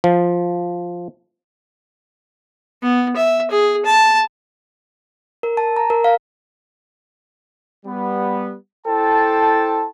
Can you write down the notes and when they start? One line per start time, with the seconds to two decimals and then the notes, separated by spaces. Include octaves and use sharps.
0.04 F3
2.82 B3
3.16 E5
3.51 G#4
3.85 A5
5.43 A#4
5.57 A5
5.76 A#5
5.90 A#4
6.04 F5
7.86 G3 B3
8.87 E4 A4 C5 G5 A5